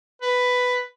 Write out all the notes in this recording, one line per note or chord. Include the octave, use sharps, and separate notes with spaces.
B4